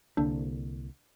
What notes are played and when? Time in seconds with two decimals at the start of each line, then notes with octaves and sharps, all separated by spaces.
0.17 C2 D3 A#3 D4